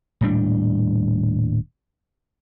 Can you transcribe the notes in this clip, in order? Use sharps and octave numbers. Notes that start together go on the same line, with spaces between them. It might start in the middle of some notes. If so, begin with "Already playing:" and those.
D#1 A2 G3 D4